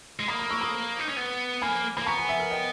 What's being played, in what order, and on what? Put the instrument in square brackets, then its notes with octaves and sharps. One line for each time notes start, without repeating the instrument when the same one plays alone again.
[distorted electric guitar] G#3
[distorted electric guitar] A#3 [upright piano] B5 D#6
[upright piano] B5 D#6
C#6 E6
B5 D#6
[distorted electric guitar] D#4
C#4
B3
[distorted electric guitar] A#3 [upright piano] G#5 B5
[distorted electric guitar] A#3 [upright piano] B5
[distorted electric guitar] B3 [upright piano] A#5 C#6
[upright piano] G#5 B5
E5 G#5
A#4
D#5 G5